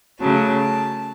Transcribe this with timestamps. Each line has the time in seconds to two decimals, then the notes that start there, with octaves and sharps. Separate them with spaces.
0.20 C#3 F#3 A3 A5